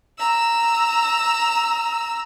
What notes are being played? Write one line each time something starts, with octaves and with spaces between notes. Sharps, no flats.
A#5 E6